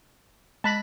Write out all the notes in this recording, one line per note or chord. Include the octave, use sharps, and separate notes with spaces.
G#3 A5 B5 F#6 A#6